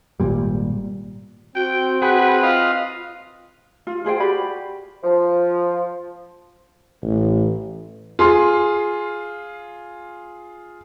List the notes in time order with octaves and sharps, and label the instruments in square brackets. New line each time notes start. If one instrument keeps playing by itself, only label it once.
[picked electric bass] G#1 C#2 A#2 G3
[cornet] C4 [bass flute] F#4 [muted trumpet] G5
[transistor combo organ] G#4 F#5 B5 [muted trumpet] B4
[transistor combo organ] F4 D#5 F5
[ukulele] F4
F4 G#4 C5 G5
F#4 G4 D5 B5
[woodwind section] F3
[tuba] A1
[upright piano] F4 G#4 C6